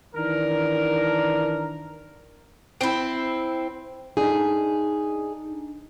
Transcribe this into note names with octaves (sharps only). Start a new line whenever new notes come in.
D#3 E3 D4 A#4
C4 E4
D4 D#4 G#4